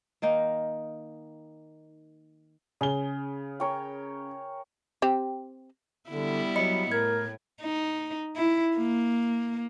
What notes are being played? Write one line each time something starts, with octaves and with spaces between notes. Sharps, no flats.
D#3 A#3 D#4
C#3 G#4 G7
A#4 C#5 G5
C4 G4
D3 G3 B3 E4
F#3 D#5 B5 C#7
A2 A#4 G#6
D#4
E4
A#3